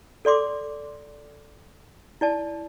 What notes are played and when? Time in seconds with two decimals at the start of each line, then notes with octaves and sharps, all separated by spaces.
0.25 A4 D5 C6 D6
2.21 E4 D5 A5